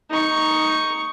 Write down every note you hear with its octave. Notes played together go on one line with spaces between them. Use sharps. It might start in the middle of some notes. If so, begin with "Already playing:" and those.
D#4 C#6